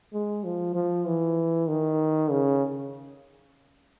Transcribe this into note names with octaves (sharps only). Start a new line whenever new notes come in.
G#3
F3
F3
E3
D#3
C#3